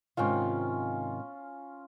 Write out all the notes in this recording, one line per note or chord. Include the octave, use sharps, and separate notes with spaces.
G#2 C3 D#3 C#4 F4